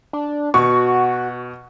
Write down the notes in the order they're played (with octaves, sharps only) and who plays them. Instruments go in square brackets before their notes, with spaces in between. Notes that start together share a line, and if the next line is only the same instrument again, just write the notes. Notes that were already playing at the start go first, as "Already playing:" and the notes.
[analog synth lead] D4
[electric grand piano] B2 [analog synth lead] F#4 [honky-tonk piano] C#6